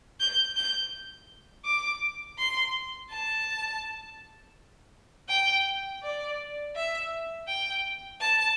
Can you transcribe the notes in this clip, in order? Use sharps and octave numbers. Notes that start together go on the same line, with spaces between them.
G6
G6
D6
C6
A5
G5
D5
E5
G5
A5